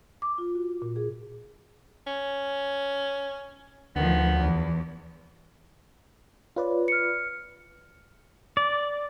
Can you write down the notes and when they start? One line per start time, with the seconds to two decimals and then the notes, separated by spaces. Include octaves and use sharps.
0.22 D6
0.38 F4
0.55 F#4
0.82 A#2
0.96 G#4
2.07 C#4
3.96 D2 D#3 F3 B3
4.33 E2
6.56 F4 B4 C#5 D5
6.88 F6 C#7
8.57 D5